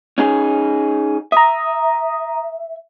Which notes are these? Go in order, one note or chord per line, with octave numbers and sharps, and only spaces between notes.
C#4 D#4 G#4
E5 A#5 D#6